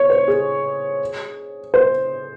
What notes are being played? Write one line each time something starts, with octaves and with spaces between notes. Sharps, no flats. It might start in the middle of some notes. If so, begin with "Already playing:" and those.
Already playing: C#5
C5
G#4
C5